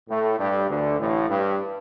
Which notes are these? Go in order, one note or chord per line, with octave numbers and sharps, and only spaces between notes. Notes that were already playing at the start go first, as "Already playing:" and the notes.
A2 A3
G2 G3
D2 D3
A1 A2
G2